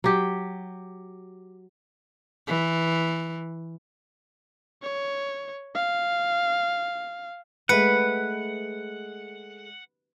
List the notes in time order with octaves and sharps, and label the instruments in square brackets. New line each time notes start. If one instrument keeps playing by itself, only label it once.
[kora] F#3 G4
[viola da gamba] E3
[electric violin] C#5
F5
[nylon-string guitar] G#3 A3 [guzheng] B4 [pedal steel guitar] F#5